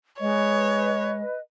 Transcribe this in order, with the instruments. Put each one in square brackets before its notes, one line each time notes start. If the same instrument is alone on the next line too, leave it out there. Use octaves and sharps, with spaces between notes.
[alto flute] G#3 [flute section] B4 D#5 [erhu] C#5